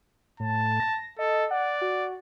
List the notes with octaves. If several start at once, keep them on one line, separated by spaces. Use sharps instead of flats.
A2 A5
A#6
A4 D#5
D5 F#5
F#4